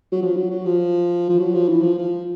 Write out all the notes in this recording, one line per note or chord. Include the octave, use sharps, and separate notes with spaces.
F#3
F3
F#3
F#3
F3
F3
F#3
F3
E3
F3
F3